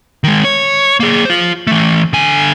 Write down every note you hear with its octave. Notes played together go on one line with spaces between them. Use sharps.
D#3 G#3
C#5
A#3 G#4
F4 C5
E3 A3
D3 G#5